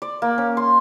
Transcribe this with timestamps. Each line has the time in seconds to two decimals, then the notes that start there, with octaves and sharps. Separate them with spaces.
0.02 D5
0.22 A#3
0.38 C#4
0.57 C6